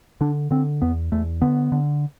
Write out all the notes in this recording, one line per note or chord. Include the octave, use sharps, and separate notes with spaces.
D3 D4
D3 C4
E2 B3
E2 A3
D3 B3
D3